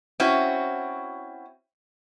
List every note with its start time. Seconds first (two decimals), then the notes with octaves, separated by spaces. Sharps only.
0.20 C4 C#4 E4 F#4